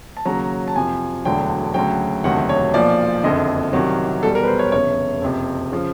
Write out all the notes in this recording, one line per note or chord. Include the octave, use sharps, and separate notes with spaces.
A5
D#2 C#3 F#3 A#5
A5
F2 C3 F3 G#5
E1 D2 D3 F#3 G5
D2 C#3 F#3 G5
E1 D2 C3 D#3 F#3 F#5
C#5
B1 A#2 F3 D5
F#1 F2 D3 D#5
C2 C3 D#3 F#3
E2 B2 G3 A4
A#4
B4
C5
C#5
F1 E2 C#3 C#5
F#1 F2 C3
C#3 F3